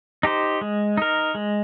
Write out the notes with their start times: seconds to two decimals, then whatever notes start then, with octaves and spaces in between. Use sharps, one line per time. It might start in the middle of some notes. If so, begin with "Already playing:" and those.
0.23 D#4 G4 C5
0.61 G#3
0.97 D#4 A#4
1.35 G#3